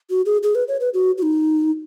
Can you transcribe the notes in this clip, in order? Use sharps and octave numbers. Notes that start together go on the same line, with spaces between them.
F#4
G#4
G#4
B4
C#5
B4
F#4
F#4
D#4